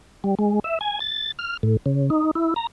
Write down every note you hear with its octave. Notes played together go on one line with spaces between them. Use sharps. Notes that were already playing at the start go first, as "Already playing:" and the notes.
G3
G#3
E5
G#5
A6
F6
A2
C#3
D#4
E4
A#5